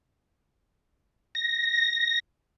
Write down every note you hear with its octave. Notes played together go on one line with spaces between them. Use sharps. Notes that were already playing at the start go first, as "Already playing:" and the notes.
A#6